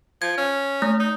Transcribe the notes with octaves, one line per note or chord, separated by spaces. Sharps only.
F3 G#6
C#4
A3
D#4